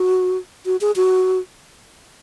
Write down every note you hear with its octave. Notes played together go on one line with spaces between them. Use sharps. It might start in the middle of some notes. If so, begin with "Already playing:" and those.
Already playing: F#4
F#4
G#4
F#4